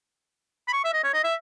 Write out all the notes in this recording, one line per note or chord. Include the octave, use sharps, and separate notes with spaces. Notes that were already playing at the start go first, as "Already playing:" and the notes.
B5
C#6
E5
D#5
C#5
D#5
E5